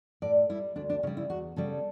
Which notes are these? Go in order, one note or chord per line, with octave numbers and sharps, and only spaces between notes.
A2 D5
G3 E4
D2 D4
D4
C#3 G3 C#4
E4
E2 F#4
C#3 G3 A4